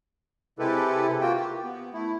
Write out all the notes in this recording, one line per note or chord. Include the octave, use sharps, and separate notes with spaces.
C3 G#3 E4 G4 A4 B4
A#3 F4 F#4 G5
G4
B3
A3 E4